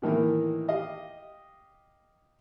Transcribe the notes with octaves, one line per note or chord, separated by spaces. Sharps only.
A2 D#3 E3 A#3
G4 D#5 F5